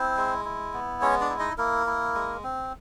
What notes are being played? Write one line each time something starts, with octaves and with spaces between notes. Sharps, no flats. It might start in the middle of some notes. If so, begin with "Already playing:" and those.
Already playing: C4 E4 C5
G#3
E4
B3
G#3 C#4 C#5
D4 D5
E4
D#4 D#5
A#3 E4 A#4
E4
G#3
C4